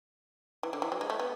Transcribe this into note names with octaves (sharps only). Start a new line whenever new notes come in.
E3
D3
E3
F#3
G#3
A3
B3